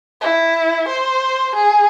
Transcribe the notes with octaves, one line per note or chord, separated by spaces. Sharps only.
E4
C5
G#4